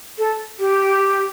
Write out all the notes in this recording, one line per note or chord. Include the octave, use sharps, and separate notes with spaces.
A4
G4